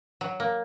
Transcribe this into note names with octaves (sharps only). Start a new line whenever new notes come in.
F#3
A#3